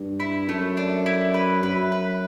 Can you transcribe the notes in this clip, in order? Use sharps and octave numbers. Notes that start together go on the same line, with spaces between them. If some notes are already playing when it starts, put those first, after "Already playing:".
Already playing: G2
E4
F#2 A3
D4
E4
B4
F#2 B4
B4